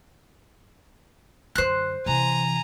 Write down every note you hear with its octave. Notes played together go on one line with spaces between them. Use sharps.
F#2 D3 C5 F#6
C3 E3 G#5 A#5